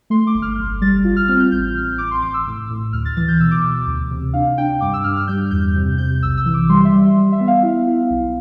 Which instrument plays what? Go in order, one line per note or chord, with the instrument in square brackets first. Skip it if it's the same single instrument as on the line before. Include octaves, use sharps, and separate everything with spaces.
[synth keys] A3 C6
D6
G1
F6
B1
G3 A6
F4
F6
C4 F6
G6
A1 G6
A1 F6
A1 D6
C6
A1 D6
E6
A2
A2
D2 F6
A6
E3 A6
G6
B2 E6
D6
B2
D2
C3
D4 F5
D4 G5
G2 D6
E6
G2 F6
F6
G3 G6
E2 G6
C3
C3 G6
B1 E6
E6
E3
D6
G3 C6
E5
G3
G3
E5
B3
F5
E4
E4
B1